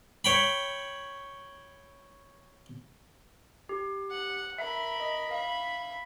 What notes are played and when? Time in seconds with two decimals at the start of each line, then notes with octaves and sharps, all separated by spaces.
0.25 C#5 G5 B5
3.69 G4
4.11 F#5
4.58 A#4 E5 B5
5.00 D#5
5.31 E5 F5 B5